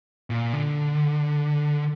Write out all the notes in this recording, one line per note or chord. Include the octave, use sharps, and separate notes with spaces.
A#2
D3